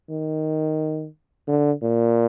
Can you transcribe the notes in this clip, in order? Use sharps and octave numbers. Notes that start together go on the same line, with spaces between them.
D#3
D3
A#2